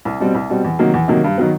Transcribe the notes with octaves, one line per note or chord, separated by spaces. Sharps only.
C2
B2 G3 C4
C2
B2 G3 C4
E2
C3 D#3 F#3 A#3
E2
C3 D#3 F#3 A#3
G2
D#3 F#3 B3